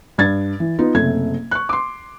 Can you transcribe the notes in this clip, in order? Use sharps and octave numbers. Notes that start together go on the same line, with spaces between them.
G2 G#6 A6
E3
B3 D#4 F4
F#1 C3 A3 G#6
C#6 F#6
C6 D6